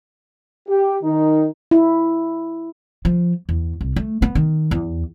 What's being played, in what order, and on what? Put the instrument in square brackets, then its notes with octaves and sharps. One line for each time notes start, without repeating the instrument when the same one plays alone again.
[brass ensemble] G4
D#3 D#4
[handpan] E4
[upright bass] F3
E2
C2
A3
B3
D#3
E2